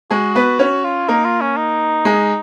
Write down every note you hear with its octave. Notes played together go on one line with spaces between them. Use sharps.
G#3 F#4 G#4
B3 B4
C#4 F#4 C#5
F4
A#3 D#4 A#4
F4
C#4
D#4
G#3 G#4